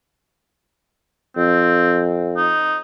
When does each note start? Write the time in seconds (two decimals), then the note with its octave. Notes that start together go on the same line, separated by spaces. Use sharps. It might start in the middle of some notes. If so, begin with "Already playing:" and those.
1.37 F2 C4
2.37 D#4